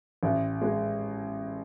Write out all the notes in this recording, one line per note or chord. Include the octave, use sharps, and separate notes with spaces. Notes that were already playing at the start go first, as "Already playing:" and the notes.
A1
G#3